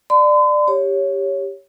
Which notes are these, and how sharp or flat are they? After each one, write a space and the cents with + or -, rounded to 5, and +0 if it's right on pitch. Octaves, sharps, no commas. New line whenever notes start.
D5 +20 C6 -45
G4 +10 C#5 +0